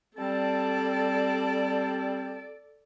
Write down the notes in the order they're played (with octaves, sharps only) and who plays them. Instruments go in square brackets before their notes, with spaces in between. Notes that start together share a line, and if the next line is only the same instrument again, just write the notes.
[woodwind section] G3 C4 A5 [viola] A4 D5